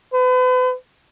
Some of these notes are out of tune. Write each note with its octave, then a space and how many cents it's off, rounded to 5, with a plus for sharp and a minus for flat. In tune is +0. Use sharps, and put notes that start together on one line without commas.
B4 +40